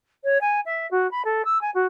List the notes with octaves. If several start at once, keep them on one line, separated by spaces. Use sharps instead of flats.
C#5
G#5
E5
F#4
B5
A4
E6
G#5
F#4